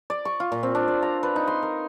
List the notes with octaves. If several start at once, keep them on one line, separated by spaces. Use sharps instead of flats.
D5
C#6
F4
A#2
C4
D4
D5
A#5
B4
D#4
C6
A#4